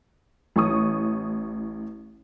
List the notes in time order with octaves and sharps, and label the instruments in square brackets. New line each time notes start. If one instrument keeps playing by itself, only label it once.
[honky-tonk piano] A1 E4 C#6 D#6